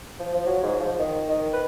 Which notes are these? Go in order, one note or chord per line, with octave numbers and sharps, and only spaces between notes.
F3
F3
F#3
G#2
F3
D#3
D#3
B4